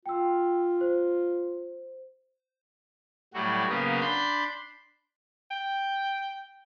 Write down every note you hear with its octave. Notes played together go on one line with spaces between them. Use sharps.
F4 G5 E6
C5
A2 F#3 G3 F#4
C#3 F#3 A#3 B3 C#4
D4 B5 C6 G6
G5